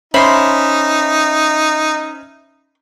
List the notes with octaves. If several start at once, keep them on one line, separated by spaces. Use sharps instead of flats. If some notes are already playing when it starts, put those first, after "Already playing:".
C#4 D#4 C5 E5 B5 C6